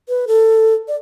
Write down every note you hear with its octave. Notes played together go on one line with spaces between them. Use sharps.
B4
A4
D5